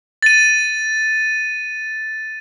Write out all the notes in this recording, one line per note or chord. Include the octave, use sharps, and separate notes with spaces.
A6 D#7